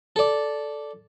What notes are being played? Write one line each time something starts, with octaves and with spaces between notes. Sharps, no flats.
A4 D5